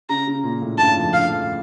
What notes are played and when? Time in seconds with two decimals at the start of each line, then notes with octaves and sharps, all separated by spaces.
0.09 C#3 A#5
0.27 C#3
0.43 A#2
0.62 A2
0.78 G2 A5
0.95 F2
1.13 D3 F5
1.30 F3